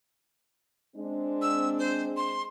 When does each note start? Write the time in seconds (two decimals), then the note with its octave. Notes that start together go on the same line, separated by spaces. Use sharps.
0.96 G#3 C4 D4
1.42 E6
1.79 C5
2.17 C6